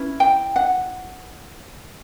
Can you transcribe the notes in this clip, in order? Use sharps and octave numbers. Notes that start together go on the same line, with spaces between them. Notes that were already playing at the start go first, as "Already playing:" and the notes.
Already playing: C#4 E4 B4
G5
F#5